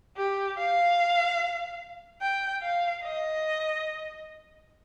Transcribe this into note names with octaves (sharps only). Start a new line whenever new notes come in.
G4
F5
G5
F5
D#5